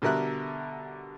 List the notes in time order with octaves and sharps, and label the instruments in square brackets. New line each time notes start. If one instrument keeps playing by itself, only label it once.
[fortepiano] B2 D3 G3 A#4 E5 F#6